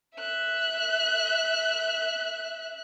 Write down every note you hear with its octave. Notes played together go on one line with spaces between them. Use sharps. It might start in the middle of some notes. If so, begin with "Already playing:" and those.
E5 F#6